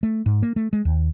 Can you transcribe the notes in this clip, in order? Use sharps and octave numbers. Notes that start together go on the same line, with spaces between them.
A3
G#2
A#3
A3
G#3
D#2